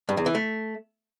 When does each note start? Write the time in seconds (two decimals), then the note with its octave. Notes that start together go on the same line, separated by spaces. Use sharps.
0.09 G2
0.17 E2
0.26 E3
0.35 A3